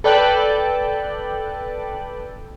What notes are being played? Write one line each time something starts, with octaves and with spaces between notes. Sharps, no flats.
A4 B4 D5 G5 A5 F#6